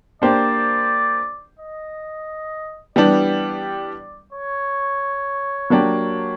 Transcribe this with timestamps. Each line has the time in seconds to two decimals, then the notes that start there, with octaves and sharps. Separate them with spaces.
0.22 A#3 D4 G4 C5 D5
1.59 D#5
2.96 E3 G3 B3 D4 G4 D5
4.33 C#5
5.70 F#3 A#3 D4 G4